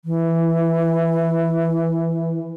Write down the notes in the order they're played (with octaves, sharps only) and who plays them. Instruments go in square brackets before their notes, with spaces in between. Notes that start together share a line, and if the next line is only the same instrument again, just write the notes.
[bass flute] E3